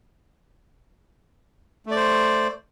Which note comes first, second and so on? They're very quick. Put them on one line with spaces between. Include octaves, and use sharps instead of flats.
A3 D5 C5